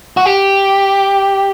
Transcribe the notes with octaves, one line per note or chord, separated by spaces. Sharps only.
F#4
G4